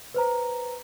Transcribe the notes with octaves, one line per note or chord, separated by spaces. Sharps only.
B4 C5 A#5